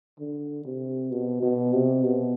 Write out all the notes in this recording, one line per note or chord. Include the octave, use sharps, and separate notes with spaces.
D3
C3
B2
B2
C3
B2